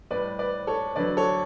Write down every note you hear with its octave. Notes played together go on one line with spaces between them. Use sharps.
A2 G3 B4 D5
B4 D5
A4 C#5
D2 D3 F#3 B4 D5
A4 C#5